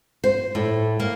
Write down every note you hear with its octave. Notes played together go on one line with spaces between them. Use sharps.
C5
A2
A#3